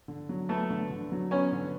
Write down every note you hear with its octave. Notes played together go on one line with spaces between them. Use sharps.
D3
F#3
A3 B3 A4
D3
D3
F#3
B3 C#4 C#5
D3